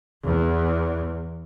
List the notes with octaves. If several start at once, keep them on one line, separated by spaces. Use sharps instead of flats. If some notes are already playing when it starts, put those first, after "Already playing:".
E2